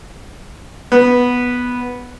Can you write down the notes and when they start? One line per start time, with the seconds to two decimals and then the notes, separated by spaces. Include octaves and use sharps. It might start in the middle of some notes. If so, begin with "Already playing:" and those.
0.92 B3